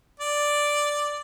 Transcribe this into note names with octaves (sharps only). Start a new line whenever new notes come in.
D5